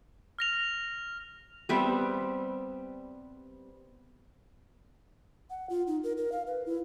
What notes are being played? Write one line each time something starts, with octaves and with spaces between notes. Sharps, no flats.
F6 A#6 F7
G3 B3 C4 E5
F#5
F4
D#4
A#4
A#4
F5
B4
E4